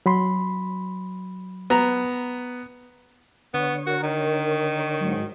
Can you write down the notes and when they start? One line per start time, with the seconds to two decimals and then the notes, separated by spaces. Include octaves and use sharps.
0.06 F#3 B5 C6
1.70 B3 A#5
3.54 D3 B3 C#5
3.87 F#4 A#4
4.03 D#3
5.01 G#2 F#3